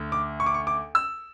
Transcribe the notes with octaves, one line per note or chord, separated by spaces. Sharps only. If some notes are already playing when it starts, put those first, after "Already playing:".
Already playing: D2
D6
C#6
D6
C#6
D6
E6